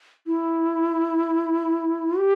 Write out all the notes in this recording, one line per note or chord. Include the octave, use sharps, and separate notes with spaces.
E4
G4